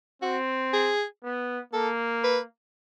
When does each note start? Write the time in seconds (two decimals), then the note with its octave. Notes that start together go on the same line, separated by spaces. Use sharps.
0.22 C4 F#4
0.73 G#4
1.24 B3
1.73 A#3 A4
2.24 B4